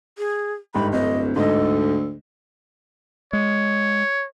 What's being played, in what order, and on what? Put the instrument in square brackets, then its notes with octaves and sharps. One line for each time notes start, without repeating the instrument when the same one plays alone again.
[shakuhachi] G#4
[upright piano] G1 G#2 G4 [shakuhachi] B5
[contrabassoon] D1 [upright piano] G1 [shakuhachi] D#5
[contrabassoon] D2 [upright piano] G#2 D#5 [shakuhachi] A4
[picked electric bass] G#3 [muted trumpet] C#5